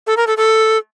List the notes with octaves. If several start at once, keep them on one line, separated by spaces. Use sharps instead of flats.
A4
A#4
A4
A4